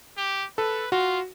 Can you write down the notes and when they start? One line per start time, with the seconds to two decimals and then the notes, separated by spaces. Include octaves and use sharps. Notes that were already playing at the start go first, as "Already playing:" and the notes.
0.17 G4
0.58 A4 B4
0.92 F4 F#4